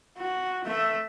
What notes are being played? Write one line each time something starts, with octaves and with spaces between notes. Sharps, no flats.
F#4
A3 E5